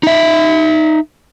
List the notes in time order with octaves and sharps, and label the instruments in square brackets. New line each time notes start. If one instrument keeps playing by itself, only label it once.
[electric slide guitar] D#4 E5